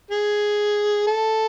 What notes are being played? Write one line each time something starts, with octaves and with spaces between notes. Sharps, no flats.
G#4
A4